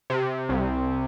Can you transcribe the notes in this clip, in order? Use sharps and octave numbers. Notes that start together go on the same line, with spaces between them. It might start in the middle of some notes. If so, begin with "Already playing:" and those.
C3
C2